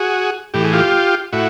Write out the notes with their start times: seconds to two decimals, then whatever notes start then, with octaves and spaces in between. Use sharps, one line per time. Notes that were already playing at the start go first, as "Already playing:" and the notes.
Already playing: F#4 G#4
0.54 A2 E3 G4
0.64 G#4
0.73 F4 G4
1.33 A2 E4 F#4